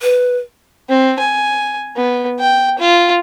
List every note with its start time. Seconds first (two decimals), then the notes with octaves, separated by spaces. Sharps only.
0.02 B4
0.89 C4
1.19 G#5
1.96 B3
2.40 G5
2.79 F4